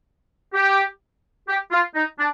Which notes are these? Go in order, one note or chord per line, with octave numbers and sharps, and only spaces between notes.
G4
G4
F4
D#4
D4